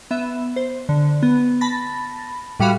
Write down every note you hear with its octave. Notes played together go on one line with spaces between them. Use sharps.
B3 E5
C5
D3
B3
A5 B5 A6 A#6
A2 G3 F#4 F5 B5